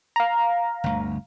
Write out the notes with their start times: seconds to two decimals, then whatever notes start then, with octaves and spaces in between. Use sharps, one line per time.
0.16 F5 A#5
0.84 G1 D2